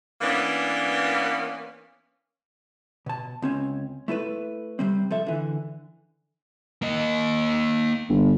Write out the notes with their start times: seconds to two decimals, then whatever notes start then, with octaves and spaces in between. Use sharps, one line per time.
0.22 E3 A#3 B3 C#4 D4
3.06 B2 A5
3.42 C#2 C4 C#4
4.08 A3 E4 A4 B4
4.79 C3 G3 C4
5.11 F3 A4 E5
5.27 D3 E3
6.82 A#3 D#5
8.09 G1